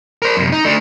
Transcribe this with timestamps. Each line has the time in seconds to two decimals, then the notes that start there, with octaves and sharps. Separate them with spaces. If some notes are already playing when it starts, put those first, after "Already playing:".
0.22 A#4 C5
0.37 F#2 C3
0.52 D#4
0.65 A3 D4